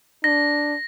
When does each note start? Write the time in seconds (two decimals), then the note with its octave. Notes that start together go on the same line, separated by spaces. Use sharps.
0.24 D4 A#6